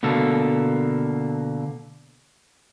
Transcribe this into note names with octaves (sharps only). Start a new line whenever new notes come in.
B2 D3 A#3 A4